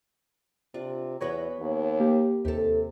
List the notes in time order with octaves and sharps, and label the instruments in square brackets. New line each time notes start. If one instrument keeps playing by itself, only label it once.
[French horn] C3 [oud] D4 F4
[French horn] E2 [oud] B3 F#4 B4 [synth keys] C#5
[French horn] D#2
[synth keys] A#3 G4
[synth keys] D#2 [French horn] C3 [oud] G4 A4